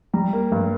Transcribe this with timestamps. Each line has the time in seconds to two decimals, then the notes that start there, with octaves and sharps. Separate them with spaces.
0.14 G3 A#5
0.33 A#3
0.52 G2